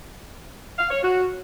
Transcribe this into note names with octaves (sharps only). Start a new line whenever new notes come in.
F5
C#5
F#4